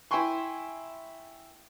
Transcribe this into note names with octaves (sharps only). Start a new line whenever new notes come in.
E4 E5 G5 G#5 C6 C#6